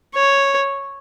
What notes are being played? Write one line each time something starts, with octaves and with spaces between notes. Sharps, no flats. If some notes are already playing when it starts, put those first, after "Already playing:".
C#5